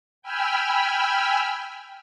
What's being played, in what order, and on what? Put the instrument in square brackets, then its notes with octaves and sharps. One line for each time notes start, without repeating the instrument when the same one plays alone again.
[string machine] G5 G#5 B5 E6 F6